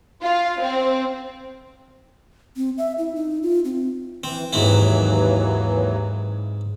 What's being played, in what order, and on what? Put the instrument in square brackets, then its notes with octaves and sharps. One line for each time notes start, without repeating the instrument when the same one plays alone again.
[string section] F4
C4
[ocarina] C4
E5
E4
D#4
F4
C4
[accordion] E3 [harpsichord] C4
[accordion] D#2 E3 F#3 [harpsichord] G#2 C4 E4